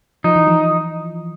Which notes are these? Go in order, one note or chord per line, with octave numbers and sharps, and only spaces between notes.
F3 D#4
E3
F3